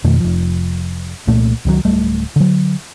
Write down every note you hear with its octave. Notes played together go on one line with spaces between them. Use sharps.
F2 B2 D#3 A3
F1 F3
C2 A#2 A3 A#3
C#2 D#3 F#3
D1 G3 A3
D3 F#3